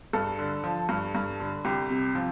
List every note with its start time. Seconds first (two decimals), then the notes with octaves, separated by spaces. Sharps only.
0.13 G2 A4
0.39 D3
0.64 F3
0.89 G2
1.15 G2
1.40 D3
1.65 C2 G4
1.90 C3
2.15 F3